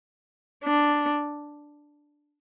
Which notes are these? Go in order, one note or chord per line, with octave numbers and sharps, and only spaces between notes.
D4